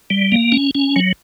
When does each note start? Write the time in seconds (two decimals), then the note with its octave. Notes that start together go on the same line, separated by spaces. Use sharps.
0.10 G3
0.32 A#3
0.52 C#4
0.75 C#4
0.96 F#3